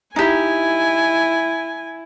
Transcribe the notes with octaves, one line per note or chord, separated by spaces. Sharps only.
D#4 E4 G4 G#5